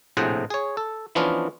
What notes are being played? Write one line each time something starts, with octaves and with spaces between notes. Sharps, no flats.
A#1 A2 C3 G#4 C5 F#5
G#4 C#5
A4
E3 F3 B3 C#4 D4 F4